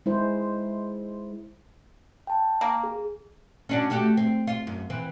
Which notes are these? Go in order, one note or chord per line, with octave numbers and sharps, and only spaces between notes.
G#3 E4 C5
G5 A5
A#3
G#4
C#4 D4 F#4
A3 F#4 G4
C4
F4
F#2
E3 C4